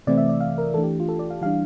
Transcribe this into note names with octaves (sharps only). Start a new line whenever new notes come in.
C3 E3 A3 C4 E4 D5
E5
D5
F5
A#4
E3 A3 D4 A4
G4
F4
A4
D5
F5
E3 G3 D4 F5